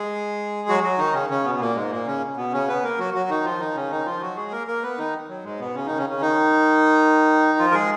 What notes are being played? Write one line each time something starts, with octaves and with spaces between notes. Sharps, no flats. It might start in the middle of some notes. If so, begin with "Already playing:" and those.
Already playing: G#3 G#4
F#3 F#4
F#3 F#4
D#3 D#4
C#3 C#4
C#3 C#4
B2 B3
B3
A#2 A#3
G#2 G#3
A#2 A#3
C#3 C#4
B2 B3
C#3 C#4
B3 B4
A#3 A#4
F#3 F#4
F#3 F#4
D#3 D#4
F3 F4
D#3 D#4
C#3 C#4
D#3 D#4
F3 F4
F#3 F#4
G#3 G#4
A#3 A#4
A#3 A#4
B3 B4
D#3 D#4
F#3
G#2 G#3
B2 B3
C#3 C#4
D#3 D#4
C#3 C#4
C#3 C#4
D#3 D#4
F3 F4
A#4
G#3 G#4